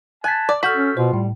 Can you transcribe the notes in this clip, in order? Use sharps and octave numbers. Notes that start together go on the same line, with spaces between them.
G#5 A5 F#6 G#6 B6
D5
F#4 A4 F6 G6 B6
C#4
B2 F4 C5
A2 G3